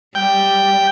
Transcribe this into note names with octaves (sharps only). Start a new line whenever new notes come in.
G3 G5